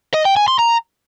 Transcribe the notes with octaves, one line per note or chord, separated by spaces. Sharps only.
D#5
G5
G#5
C6
A#5